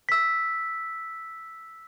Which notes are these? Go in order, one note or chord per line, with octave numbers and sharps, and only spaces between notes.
E6 B6